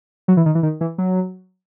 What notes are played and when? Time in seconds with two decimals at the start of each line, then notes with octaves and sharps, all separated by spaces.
0.28 F#3
0.37 E3
0.46 D#3
0.55 E3
0.63 D#3
0.81 E3
0.98 F#3